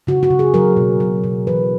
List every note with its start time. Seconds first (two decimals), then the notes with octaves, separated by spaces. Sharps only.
0.07 C#3 F#4
0.23 F#4
0.30 C#3
0.39 G#4
0.54 F#3 A#4
0.77 B2
1.00 F#3
1.24 B2
1.47 E3 B4